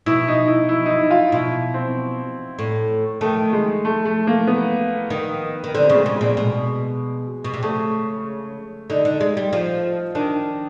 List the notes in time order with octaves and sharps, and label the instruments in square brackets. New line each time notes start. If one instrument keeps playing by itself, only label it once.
[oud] B2 [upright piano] E4
[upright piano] D#4
E4
E4
D#4
E4
F4
[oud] B2 [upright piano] E4
[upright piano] C4
[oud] A2
[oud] D#3 [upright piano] A3
[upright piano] G#3
A3
A3
A#3
B3
[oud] D#3
D#3
[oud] D3 [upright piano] C4
[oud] C#3
[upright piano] G#3
[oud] C#3
[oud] A#2 [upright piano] G#3
[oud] B2 [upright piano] G#3
[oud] B2
C3
[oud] C#3 [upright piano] A3
[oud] D3 [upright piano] D#4
[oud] D3
G#3
G3
F3
[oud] D#3 [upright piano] D4